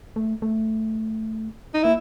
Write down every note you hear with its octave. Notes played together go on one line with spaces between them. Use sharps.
A3
A3
D#4
A#3 E4